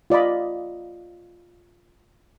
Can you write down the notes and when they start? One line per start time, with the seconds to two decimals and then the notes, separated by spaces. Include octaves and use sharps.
0.10 F4 D5 D#5 B5